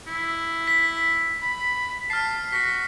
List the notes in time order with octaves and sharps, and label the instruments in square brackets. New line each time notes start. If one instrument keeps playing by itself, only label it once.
[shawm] E4
[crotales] B6
[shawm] B5
[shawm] A5 [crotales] F6 C7
[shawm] F#4 [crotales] B6